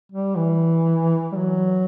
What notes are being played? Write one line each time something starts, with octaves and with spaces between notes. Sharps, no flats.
G3
E3
G3
F#3